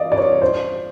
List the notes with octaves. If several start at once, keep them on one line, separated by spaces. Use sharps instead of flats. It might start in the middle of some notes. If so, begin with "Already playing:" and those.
Already playing: D5 D#5 F5
D5
C#5
C5